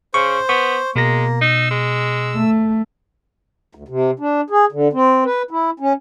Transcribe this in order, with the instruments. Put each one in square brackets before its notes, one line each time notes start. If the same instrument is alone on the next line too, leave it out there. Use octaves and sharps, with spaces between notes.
[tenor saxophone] C#3 [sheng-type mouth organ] C5 [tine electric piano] C#6
[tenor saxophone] B3 [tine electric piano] C#6
[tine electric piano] B2 A#6 [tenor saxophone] G#3 [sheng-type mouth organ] A#3
[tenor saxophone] D#4 [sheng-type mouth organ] E6
[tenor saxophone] G#3
[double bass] A3
[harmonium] D2
C3
D4
G#4
D3
C4
B4
E4
C#4